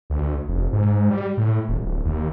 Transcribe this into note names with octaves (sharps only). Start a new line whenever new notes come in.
D2
F1
G#2
G3
A2
D#1
D1
D#2